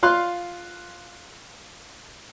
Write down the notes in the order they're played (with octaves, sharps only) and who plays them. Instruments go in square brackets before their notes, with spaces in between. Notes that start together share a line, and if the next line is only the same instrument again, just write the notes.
[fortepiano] F4 F5 C6 F#6